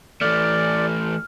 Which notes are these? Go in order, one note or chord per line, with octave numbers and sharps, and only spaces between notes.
E3 A3 D5 F6